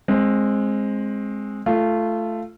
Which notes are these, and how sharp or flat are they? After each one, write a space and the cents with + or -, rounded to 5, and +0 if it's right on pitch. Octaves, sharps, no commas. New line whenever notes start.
G#3 +0 C4 +20
A3 +0 F4 -20